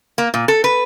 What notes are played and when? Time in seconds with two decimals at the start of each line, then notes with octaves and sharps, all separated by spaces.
0.18 A#3
0.34 A#2
0.48 A4
0.64 B4